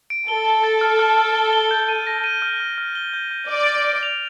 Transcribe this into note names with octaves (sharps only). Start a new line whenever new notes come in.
D7
A4 G7
G7
A6
F6
F6
F6
G7
G7
G6
D#7
A#6
D#7
F6
F6
F6
G7
G6
G6
D5 D7
A6
D7
F7